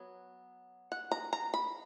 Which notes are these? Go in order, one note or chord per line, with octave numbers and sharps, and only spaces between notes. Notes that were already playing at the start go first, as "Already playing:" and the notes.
Already playing: F#3 B3
F#5
A#5
A#5
B5